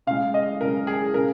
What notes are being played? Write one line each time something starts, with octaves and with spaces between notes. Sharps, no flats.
C#3 G#3 F5
D#5
C#3 G#3 A#4
G#4
C#3 A#4